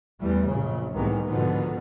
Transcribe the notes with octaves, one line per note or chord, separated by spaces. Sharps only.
E2 E3 G3 A3
A#1 F#2 C#3
C2 A2 D#3 E3 G#3 B3
G#2 B2 D3 D#3 F3 B3